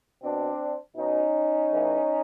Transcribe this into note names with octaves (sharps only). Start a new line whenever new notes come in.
B2 C4 D4
B2 C#4 D#4
A2 E3